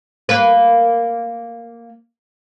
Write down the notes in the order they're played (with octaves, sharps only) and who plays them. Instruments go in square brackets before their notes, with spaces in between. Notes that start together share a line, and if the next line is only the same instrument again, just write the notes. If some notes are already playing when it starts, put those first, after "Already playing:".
[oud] A#3 B4